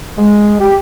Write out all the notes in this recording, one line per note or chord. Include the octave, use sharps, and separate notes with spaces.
G#3
G4